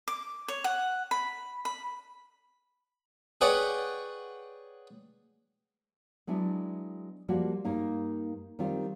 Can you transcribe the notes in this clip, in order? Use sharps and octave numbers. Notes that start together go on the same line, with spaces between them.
D6
C#5
F#5
B5
B5
G#4 B4 C#5 D5 F#5 G5
F#3 G#3 B3 D4 E4
F3 G3 A#3 F4 F#4
G2 A#3 D#4 F5
D#3 G3 C4 F4